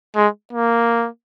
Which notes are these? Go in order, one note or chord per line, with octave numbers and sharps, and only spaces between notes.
G#3
A#3